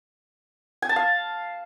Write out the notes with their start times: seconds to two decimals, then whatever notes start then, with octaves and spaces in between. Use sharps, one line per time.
0.82 G#5
0.89 A5
0.96 F5